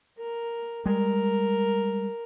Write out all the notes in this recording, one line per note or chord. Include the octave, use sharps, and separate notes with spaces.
A#4
G3 G#3 A#4